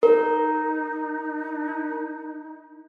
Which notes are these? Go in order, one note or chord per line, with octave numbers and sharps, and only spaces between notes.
D#4 A#4